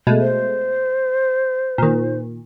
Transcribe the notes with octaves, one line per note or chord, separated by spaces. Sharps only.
B2 G#3 A3
C5
A#2 D#3